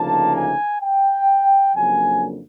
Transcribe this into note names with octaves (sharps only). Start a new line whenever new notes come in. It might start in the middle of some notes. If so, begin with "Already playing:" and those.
Already playing: D2 C#3 F3 A#3 D#4 A5
G#5
G5
F2 C#3 F#3 A#3 D4 G#5